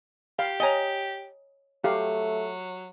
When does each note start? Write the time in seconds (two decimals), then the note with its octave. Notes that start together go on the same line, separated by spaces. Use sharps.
0.39 G4 F5
0.60 C#5 D#5 G#5 A#5 G7
1.84 F#3 A3 G4 F5